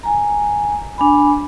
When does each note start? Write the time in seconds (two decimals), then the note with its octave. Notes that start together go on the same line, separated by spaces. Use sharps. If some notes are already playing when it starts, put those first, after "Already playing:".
0.03 G#5 A#5
0.98 D4 G#5 B5